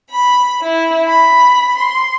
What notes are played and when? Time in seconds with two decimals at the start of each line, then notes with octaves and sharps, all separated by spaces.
0.10 B5
0.62 E4
1.06 B5
1.76 C6